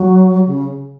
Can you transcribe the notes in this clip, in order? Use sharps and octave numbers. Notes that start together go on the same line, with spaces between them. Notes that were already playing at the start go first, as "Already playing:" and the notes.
Already playing: F#3
C#3